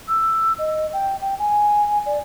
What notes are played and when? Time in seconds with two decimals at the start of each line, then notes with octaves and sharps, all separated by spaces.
0.08 E6
0.58 D#5
0.93 G5
1.22 G5
1.39 G#5
2.06 D5